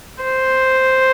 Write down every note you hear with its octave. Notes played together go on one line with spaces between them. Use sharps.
C5